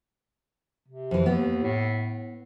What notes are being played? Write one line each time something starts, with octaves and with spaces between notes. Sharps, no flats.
C3
F2 E3
D#2 B3
A2